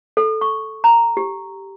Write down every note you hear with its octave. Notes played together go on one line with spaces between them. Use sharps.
A4
C#6
A#5
G4